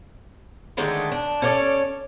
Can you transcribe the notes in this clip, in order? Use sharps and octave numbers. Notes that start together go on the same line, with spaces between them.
D3 D#3 G#3 A3
D4
C#4 A4 C#5 D5